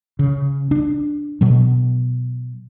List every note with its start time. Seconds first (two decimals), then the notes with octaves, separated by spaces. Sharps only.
0.19 C#3
0.71 D4
1.41 B2 F#3